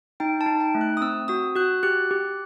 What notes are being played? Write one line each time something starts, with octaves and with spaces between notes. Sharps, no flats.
D#4 G5
A5
D#4
G5
A3
F#6
D#6
C4 E6
F#4 D#6
F#4 F#6
G4 F#6
G4